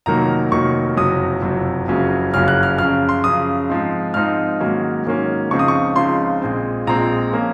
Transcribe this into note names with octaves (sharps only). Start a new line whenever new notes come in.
F1 F2 D#3 F#3 A#3 A#5
F1 F2 D#3 F#3 A#3 C#6
F#1 F2 C3 F#3 D#6
F#1 F2 C3 F#3
F#1 F2 C#3 F#3 C#4
F#1 F2 C#3 F#3 C#4 F6
F#6
F6
F#2 C#3 F3 F6
C6
F#2 C#3 F3 D#6
G#2 F3 C4 D#4
G#2 F3 C4 D#4 F6
G#2 D#3 F#3 A#3 C#4
G#2 D#3 F#3 A#3 C#4
C#2 C#3 F3 C4 D#4 C#6
D#6
C#6
C#2 C#3 F3 C4 D#4 C6
A#1 A#2 G#3 C4
A#1 A#2 G#3 C4 A#5
F3 A#3 C#4